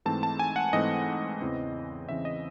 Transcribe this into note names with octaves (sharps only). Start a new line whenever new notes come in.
G#2 E3 A3 C4 A5
A5
G#5
F#5
G#2 E3 A3 C4 D#5
E2 C#3 E3 C4
E2 C#3 E3 C4 E5
D#5